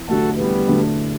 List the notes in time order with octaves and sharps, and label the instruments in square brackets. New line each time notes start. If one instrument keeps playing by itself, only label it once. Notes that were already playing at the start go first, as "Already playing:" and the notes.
Already playing: [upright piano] E2
[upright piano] D3 F#3 A3 [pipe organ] F#4 A4
[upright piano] E2 [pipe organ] G3 B3
[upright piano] D3 F#3 A3